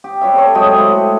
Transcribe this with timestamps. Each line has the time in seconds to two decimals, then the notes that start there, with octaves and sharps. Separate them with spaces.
0.04 G4
0.21 G3 F#4 C#5 E5
0.34 C4 A4 C#5
0.55 F#3 G#3 G4 D#5
0.77 G#3 A3 E4
0.89 F#5